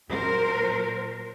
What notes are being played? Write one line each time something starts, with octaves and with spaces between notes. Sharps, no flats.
A#2 F#3 A#4 C5